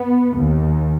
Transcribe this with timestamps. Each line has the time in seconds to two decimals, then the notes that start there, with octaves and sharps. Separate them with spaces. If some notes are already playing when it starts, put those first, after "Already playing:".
Already playing: B3
0.37 D#2